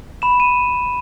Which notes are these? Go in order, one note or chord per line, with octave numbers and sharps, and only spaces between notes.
B5 E7
D#7